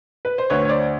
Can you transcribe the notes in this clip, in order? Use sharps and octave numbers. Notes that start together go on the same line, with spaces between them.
B4
C5
D2 B4 C#5
C#5
C5 D5